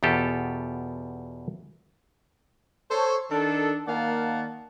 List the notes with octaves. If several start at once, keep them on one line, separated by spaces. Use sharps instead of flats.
E2 B2 F4 G4 A4
A4 C5 C#5
D#3 D4 A4
D#3 A#3 D5 F5 F#5 A5